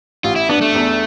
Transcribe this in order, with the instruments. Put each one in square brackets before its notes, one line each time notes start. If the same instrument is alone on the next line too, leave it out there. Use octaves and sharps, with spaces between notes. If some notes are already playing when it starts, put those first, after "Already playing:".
[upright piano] A1 [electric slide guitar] F4
[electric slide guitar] E4
[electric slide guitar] B3 [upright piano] D4
[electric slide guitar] A3
[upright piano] E2